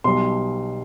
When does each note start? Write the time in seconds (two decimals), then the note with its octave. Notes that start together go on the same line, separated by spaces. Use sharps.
0.04 B1 B2 G3 C6